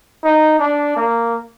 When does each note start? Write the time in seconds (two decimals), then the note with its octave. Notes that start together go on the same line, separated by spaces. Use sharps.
0.24 D#4
0.59 D4
0.96 A#3